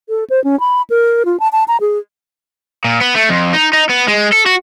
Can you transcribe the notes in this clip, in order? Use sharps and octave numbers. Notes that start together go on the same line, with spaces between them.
A4
C5
C#4
B5
A#4
F4
A5
A5
A#5
G#4
A#2
B3
A3
F2
D#4
D#4
B3
G#3
A4
F#4